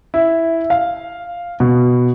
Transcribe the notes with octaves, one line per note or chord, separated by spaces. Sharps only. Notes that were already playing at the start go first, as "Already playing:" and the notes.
E4
F5
B2